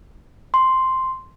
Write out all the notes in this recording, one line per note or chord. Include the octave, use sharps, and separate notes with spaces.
C6